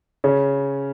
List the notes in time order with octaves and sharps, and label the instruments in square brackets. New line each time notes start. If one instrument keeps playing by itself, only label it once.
[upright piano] C#3 C#4